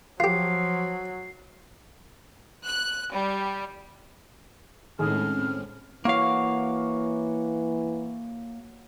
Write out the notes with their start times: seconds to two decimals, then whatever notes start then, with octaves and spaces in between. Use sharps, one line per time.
0.20 F3 F#3 F4 G4 C7
2.63 F#6
3.12 G3
4.99 A2 D#3 G#3 C4 C#4 G#4 F6
6.05 E3 A#3 F#4 C#5 F5